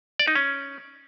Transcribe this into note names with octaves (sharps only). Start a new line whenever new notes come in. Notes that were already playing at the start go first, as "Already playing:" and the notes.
D5
D#4
C#4